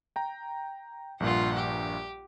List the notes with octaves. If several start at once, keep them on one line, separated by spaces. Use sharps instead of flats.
G5 A#5
A#1 G2 A#2 F4 F#5
G4